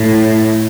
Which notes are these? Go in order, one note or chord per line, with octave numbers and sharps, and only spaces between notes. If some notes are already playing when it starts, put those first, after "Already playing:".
Already playing: A2